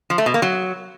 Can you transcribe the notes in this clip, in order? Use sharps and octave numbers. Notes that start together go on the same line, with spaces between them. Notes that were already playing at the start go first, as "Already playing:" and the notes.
F3
A3
B2
A#3
F#3